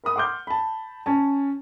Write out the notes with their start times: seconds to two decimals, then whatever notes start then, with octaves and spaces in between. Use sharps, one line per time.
0.04 A#4 B5 D#6
0.16 F#5 C6 D6 F6 G6
0.47 A5 B5
1.06 C#4 A5